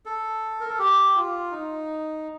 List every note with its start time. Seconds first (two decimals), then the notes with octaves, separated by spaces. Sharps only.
0.06 A4
0.60 A#4
0.69 A4
0.79 G4
1.16 F4
1.52 D#4